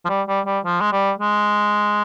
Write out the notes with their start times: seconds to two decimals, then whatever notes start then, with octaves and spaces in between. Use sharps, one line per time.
0.05 F3
0.09 G3
0.27 G3
0.46 G3
0.65 F3
0.81 G#3
0.92 G3
1.20 G#3